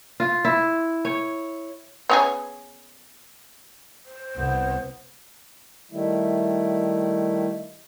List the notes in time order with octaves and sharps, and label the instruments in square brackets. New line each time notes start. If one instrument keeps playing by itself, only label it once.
[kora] F4
E4
C#5
[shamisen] B3 C#4 G#4
[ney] C5
[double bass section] C2 [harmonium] B3
[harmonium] D#3 G3 A3 E4